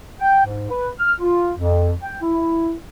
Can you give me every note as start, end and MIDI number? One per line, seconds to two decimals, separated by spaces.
0.20 0.42 79
0.45 0.70 44
0.71 0.89 71
1.00 1.14 89
1.20 1.51 65
1.57 1.92 41
2.02 2.17 79
2.22 2.73 64